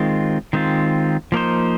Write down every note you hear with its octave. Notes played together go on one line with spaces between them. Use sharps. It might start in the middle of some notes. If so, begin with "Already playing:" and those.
Already playing: D#3 G#3 C4 F4
D#3 G#3 C4 F4
F3 A#3 D#4 C5